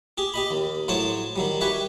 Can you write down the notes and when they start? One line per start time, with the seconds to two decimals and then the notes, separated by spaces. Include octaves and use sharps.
0.18 G4 G#4
0.34 G4 D#5 B5
0.51 D#2
0.88 A2 F#3 A4 C5 C#5 A5
1.36 D#3 F#3 G3
1.61 G4 B4 C#5 E5 G#5